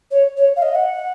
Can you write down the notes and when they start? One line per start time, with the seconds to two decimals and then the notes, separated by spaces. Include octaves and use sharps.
0.11 C#5
0.37 C#5
0.56 F5
0.62 D#5
0.75 F#5